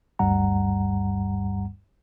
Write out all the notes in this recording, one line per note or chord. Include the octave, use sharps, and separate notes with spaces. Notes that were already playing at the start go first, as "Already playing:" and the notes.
G1 D2 G2 G3 F#5 A#5